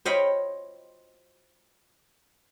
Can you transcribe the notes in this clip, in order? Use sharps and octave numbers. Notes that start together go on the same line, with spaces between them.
C5 C#5 D#5 F5 G5 B5